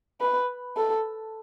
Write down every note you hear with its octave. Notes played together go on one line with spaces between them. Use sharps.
B4
A4